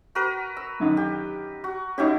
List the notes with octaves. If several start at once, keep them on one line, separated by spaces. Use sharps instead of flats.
F#4 A#4 B4
E6
F#2 D3 D#3
G4
F#4
C#4 D#4 E4 F#4 G4